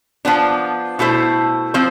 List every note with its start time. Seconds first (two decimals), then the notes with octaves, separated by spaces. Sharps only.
0.25 F3 B3 D4
0.99 B2 A3 E4 A4 C5
1.74 F3 C4 C5